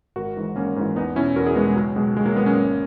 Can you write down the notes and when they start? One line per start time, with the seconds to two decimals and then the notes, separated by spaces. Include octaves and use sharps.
0.16 G#1 F#4 A#4
0.36 G#2 E3
0.56 G#1 A#3 C#4
0.76 G#2 E3
0.96 E2 B3 D#4
1.16 B2 C#4 E4
1.36 E2 F#4 A#4
1.46 E4 G#4
1.56 B2 G#3 B3
1.66 G#3
1.76 C#2 F#3
1.96 B2 G#3
2.17 C#2 G#3
2.26 F#3 A#3
2.36 B2 G#3 B3
2.46 A#3 C#4
2.56 G#1